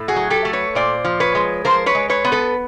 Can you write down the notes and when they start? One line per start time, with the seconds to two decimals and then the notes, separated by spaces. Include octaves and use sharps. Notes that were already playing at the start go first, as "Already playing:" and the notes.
Already playing: A2 A3
0.08 F#4 G#4
0.16 F#3
0.30 G4 A4
0.45 A3
0.53 B4 C#5
0.75 A#2 C5 D5
1.05 F3
1.20 B4 C#5
1.35 G#3
1.65 F3 A#4 C5
1.86 B4 C#5
1.95 G#3
2.10 B4 C#5
2.24 B3
2.32 A4 B4